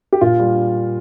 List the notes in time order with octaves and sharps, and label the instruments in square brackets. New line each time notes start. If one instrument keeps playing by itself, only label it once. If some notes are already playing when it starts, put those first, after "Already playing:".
[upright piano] G4
A#2 F4
G3